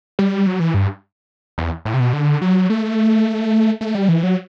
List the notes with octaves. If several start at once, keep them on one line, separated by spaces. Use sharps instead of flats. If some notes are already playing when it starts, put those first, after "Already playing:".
G3
F#3
E3
G2
E2
A2
C3
B2
D3
F#3
A3
A3
G3
E3
F#3